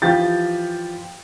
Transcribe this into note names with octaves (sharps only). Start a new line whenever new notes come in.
E3 F3 F4 G4 G6 A6